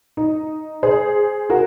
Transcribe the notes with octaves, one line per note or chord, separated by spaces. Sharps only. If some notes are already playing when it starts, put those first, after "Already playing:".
D#4
G#4 C5
F#4 A#4